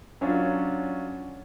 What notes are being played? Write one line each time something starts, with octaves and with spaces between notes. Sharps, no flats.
F#3 C#4 D4 F4